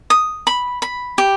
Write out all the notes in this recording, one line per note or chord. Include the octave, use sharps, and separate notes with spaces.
D#6
B5
B5
G4